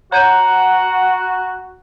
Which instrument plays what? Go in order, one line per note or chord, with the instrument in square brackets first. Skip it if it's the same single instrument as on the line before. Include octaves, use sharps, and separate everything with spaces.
[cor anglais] F#4 [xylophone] C#5 G6 D#7 [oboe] F#5 [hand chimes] A#5